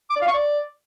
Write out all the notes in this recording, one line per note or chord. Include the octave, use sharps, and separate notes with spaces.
D6
D5
F5
C#6
D5